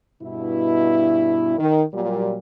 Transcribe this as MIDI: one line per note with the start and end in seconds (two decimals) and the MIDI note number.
0.22 1.56 43
0.22 1.56 47
0.22 1.56 64
1.58 1.81 51
1.93 2.37 46
1.93 2.37 54
1.93 2.37 55